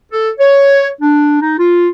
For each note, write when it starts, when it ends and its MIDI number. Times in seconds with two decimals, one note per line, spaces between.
0.12 0.30 69
0.39 0.90 73
1.01 1.39 62
1.42 1.57 63
1.59 1.89 65